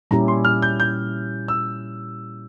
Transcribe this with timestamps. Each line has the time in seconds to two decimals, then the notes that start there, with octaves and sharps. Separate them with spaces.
0.11 A#2 G3 C#4 E4 G4 A#5
0.28 C6
0.45 F6
0.62 G6
0.80 G6
1.48 E6